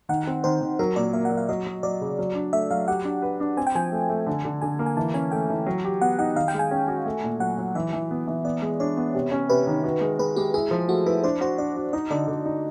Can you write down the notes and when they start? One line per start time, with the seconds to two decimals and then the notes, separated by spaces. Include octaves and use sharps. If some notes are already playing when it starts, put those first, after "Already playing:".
0.09 D#3 F#5
0.27 C4
0.44 D#3 C5
0.61 D#3
0.79 F#3 A#4
0.96 A#2 D5
1.13 A#3 E5
1.25 F#5
1.31 F#3
1.37 F5
1.49 F#3 D#5
1.67 F#3
1.83 F#3 D5
2.01 C#3
2.19 F#3
2.35 D4
2.53 A3 E5
2.71 F#3 F5
2.88 G4 F#5
3.05 D4
3.22 B4
3.40 D4
3.57 C4 G#5
3.67 G5
3.75 F3 G#5
3.92 A3
4.10 A3
4.27 D3
4.45 D3
4.61 D3 G#5
4.79 A#3
4.86 G#5
4.97 E3 A5
5.14 C#4 G#5
5.32 A3 G5
5.50 E3
5.67 F#3
5.84 G4
6.01 B3 F#5
6.19 D#4 F#5
6.36 D#3 F5
6.48 G5
6.54 G#3
6.59 G#5
6.71 C#4
6.88 F#4
7.06 A3
7.24 A#2
7.40 F#3 F#5
7.58 F#3
7.75 E3 E5
7.93 E3
8.11 B3
8.27 E3
8.44 B3 D5
8.62 G#3
8.80 D4 C#5
8.97 B3
9.15 C3
9.31 C#4
9.50 C3 B4
9.67 D#3
9.84 F#4
10.01 G#3
10.19 G#3 B4
10.36 G#3 G4
10.54 E4 G#4
10.71 F3
10.88 A3 F#4
11.06 E4 B4
11.23 D4 C5
11.41 F#4 C5
11.58 D4 D5
11.76 F#4
11.93 D#4 D#5
12.10 D3 D5
12.28 D3
12.45 D#4